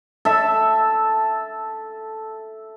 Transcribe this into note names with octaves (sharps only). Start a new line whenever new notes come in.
A4 E5